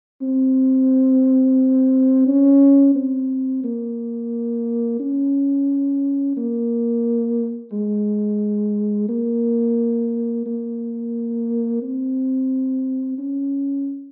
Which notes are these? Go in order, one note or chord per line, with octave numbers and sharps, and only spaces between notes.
C4
C#4
C4
A#3
C#4
A#3
G#3
A#3
A#3
C4
C#4